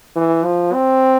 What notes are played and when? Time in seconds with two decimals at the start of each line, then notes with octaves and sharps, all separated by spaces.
0.16 E3
0.44 F3
0.73 C4